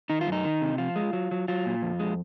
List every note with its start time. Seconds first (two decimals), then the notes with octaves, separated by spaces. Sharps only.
0.10 D#3 D#4
0.21 F4
0.27 F#2
0.32 D#4
0.45 D#3
0.62 C3
0.78 F3 F4
0.96 G#3
1.13 F#3
1.31 F#3
1.48 F#3 F4
1.66 A#2
1.82 F2
1.99 G#3